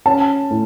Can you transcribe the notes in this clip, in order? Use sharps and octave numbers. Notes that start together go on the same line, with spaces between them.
C#4 A5
A2